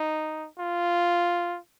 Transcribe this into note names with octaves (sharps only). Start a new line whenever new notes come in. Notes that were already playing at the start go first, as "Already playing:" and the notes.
Already playing: D#4
F4